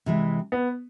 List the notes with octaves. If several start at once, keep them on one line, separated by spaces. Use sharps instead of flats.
C3 E3 G#3
B3